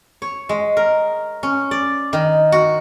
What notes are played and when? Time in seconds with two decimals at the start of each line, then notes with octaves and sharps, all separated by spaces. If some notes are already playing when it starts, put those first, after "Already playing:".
0.22 C#5
0.49 G#3
0.77 A#4
1.43 C#4
1.71 D5
2.13 D#3
2.52 F#4